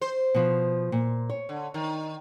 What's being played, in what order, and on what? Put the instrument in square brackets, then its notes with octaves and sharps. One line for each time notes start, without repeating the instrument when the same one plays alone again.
[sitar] C5
[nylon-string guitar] B2 F3
A#2
C#5
[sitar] D3
D#3